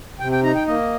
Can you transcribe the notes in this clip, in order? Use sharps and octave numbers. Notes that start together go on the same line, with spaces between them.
C3 G5
G5
D#4 A#5
G5
A#3 D#5